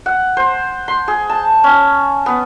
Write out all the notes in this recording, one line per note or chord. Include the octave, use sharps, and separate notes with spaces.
F#5
C5
C6
G#4
A5
C#4
B3